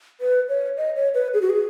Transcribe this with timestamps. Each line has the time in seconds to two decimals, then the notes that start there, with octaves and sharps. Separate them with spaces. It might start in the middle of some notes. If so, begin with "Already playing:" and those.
0.21 B4
0.49 C#5
0.77 D#5
0.96 C#5
1.14 B4
1.34 G#4
1.42 F#4
1.50 G#4